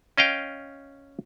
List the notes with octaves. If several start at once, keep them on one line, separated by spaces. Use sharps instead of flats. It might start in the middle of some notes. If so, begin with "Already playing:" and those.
C#4 D#5 F5 G5